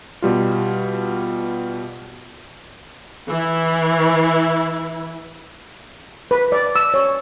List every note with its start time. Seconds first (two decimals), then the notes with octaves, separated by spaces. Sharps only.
0.22 B2 G3 F4
3.28 E3 E4
6.31 B4
6.52 D5
6.76 E6
6.94 C#5